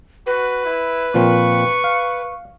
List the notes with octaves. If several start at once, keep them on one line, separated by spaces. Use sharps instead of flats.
F#4 B4
E4
A#2 F3 C4 C#6
F5